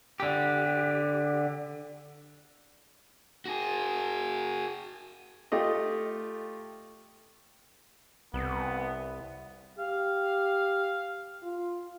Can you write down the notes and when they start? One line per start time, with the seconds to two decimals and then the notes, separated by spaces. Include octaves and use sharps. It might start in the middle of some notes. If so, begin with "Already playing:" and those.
0.20 D3 G4
3.45 F#4 G#4
5.52 A3 F4 G4 D#5
8.34 C2 B3
9.78 G4 F5
11.43 F4